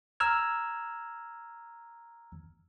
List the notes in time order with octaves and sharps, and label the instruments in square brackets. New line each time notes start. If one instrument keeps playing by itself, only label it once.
[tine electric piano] A#5 E6 F6 G#6